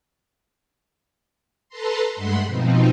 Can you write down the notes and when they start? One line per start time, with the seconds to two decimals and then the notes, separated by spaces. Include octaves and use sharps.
1.69 A4 B4 A5 A#5 C6
2.16 G2 G#3 A3 F#5 B5 C6
2.45 B2 F3 C4 D#4